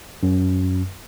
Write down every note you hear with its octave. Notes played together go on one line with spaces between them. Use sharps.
F#2